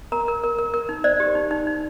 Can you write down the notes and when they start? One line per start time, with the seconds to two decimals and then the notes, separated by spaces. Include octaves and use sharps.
0.12 A#4 A#5
0.28 A#4
0.43 A#4
0.58 A#4
0.74 A#4
0.89 D#4
1.04 C5 D5
1.20 G4
1.35 D#4
1.51 D#4
1.67 D#4